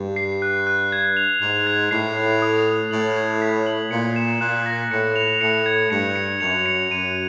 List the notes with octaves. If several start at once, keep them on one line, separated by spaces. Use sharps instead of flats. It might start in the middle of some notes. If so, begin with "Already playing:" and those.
Already playing: G2
C7
F#6
F#6
G#6
F7
G#2 F7
G#6
A2 C7
C7
D#6
D#6
A2 F#7
G#6
B6
F#7
A#2 C#7
E7
A#2 F#6
A#6
A2 C#7
F7
A2 C#7
G#6
G2 C#7
C#7
F#2 F7
C#7
F#2 D#7